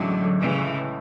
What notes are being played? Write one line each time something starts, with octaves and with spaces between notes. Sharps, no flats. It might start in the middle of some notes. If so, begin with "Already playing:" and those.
Already playing: A1 A2 D3 F#3 G#3
C#3 E3